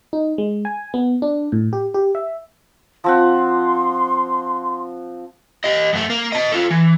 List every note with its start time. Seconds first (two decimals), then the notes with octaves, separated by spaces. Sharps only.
0.13 D#4
0.38 G#3
0.65 G#5
0.94 B3
1.22 D4
1.52 A2
1.73 G4
1.94 G4
2.15 E5
3.04 F3 C4 F#5 C6
5.64 G4 D#5
5.93 F#2 A3
6.10 A#3
6.32 D#5 A5
6.52 F4 A4
6.71 E3